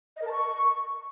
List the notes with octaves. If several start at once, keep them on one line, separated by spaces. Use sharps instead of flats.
D#5
A#4
A5
C#6